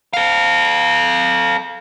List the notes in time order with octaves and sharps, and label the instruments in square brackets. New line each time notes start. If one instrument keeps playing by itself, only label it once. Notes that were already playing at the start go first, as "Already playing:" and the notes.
[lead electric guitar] A4 F5